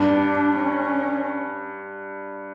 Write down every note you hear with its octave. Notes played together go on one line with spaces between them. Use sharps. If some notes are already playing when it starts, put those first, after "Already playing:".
Already playing: G2 D4
C#4